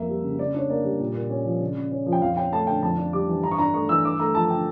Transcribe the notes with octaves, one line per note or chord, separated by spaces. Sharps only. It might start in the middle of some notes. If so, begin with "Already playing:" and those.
Already playing: F2 A#3 E5
G3
C#3
C#3 D5
D4 C#5
A#3 D5
G3
A#2
A#2
C#4
F3
C#3
C#3
C#4
F3
G5
F2 F5
C#4 G5
A3 A5
D3 G5
F2 A5
D4
G3 D6
E3
G2 A#5
C#6
D4 A#5
A3 C#6
E3 E6
G2 D6
A3 A#5
F3 A5
D3 G5